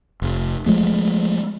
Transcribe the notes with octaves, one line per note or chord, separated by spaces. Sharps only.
F1
F3 G#3 A3